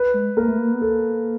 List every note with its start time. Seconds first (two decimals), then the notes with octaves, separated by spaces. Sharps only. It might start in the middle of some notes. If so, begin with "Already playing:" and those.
Already playing: B4
0.14 G#3
0.36 A#3 A#4
0.48 A3
0.58 A#3
0.74 B3
0.81 A#3 A4